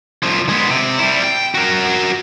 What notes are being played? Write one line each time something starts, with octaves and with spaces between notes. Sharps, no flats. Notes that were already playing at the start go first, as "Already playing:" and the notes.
C2 F3
G#3 B3
C3
G3 E4
G5
F#4 A#4